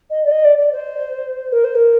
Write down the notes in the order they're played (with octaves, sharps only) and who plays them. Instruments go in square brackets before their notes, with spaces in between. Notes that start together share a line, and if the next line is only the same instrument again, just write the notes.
[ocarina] D#5
D5
D#5
D5
D5
C5
A#4
C5
A#4